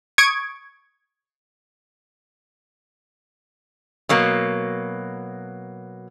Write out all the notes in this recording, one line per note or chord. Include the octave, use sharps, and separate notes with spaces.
C#6 D#6 G#6 C#7 D7
B2 F#3 A#3